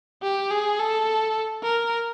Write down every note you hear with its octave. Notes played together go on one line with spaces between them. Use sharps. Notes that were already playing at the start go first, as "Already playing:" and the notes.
G4
G#4
A4
A#4